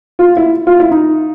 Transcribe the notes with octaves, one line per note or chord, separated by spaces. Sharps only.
F4
E4
F4
E4
D#4